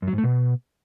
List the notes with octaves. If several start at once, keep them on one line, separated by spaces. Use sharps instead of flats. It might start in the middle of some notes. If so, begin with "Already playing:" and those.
F#2
F#3
G#2
A3
B2